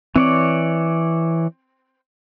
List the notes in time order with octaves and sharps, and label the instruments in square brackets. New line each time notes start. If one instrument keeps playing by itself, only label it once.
[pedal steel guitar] E3 C#5 D5 [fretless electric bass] C4